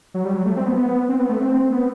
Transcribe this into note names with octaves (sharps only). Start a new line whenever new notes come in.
F#3
G3
F#3
A3
C4
B3
B3
C4
B3
A3
C4
B3